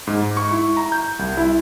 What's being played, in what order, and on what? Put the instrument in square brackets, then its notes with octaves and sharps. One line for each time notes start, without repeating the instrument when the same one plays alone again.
[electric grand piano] G#2
C#6
E4
A#5
G6
C2
E4